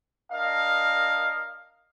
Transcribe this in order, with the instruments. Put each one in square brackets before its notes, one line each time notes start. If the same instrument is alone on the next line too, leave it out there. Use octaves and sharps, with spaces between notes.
[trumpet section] D4 A#4 D#5 F5